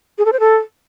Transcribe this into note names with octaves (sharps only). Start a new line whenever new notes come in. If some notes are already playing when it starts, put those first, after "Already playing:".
G#4
A4
C5
A4